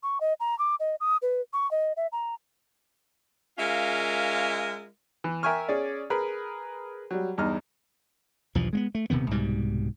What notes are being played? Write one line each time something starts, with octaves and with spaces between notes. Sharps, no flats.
C#6
D#5
A#5
D6
D#5
D#6
B4
C#6
D#5
E5
A#5
G#3 C#4 F4 A#4 E5 F5
E3
A#4 E5 G5 G#5 C#6 F6
C#4 G#4 D5
G#4 A#4 B4 B5
F#3 G3
E2 G2 D#4 F6
B1 E2 G2 F3
G#3 A#3 B3
A3
D#1 C3 D#3 B3
C2 G#2 B2 G3